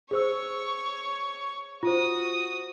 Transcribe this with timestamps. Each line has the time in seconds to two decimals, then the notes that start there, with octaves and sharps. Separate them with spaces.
0.11 G#4 C5 C#5 C#6 E6
1.83 F4 F#4 C5 D#6